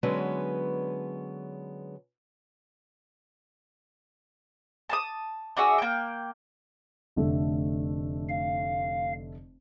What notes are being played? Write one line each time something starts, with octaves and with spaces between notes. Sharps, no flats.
D3 F#3 G#3 B3 C#4 B4
A5 C6 D#6
D4 F#4 G#4 E5
A#3 G5
F1 D3 A3
F5